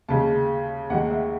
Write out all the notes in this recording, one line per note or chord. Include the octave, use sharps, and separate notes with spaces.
D#2 C#3 G#3 A5
D#2 D#3 G#3 F#5
E5